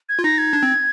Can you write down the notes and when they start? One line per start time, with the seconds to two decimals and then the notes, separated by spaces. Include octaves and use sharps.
0.09 G#6
0.19 F4
0.24 D#4 A#6
0.38 G#6
0.53 D4
0.63 C4